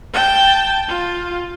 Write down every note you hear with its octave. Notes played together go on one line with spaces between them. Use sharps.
G5 A5
F4